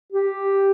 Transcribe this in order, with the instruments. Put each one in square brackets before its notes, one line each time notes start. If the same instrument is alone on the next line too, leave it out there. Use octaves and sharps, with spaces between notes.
[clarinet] G4